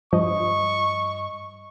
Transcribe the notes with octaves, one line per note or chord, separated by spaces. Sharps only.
G2 F3 D#5 C#6